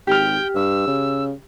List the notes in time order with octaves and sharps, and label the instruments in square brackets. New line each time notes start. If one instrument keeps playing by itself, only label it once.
[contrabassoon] G#1 [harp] G4 F6 [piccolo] G5
[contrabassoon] G2 [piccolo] E6
[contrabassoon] C#3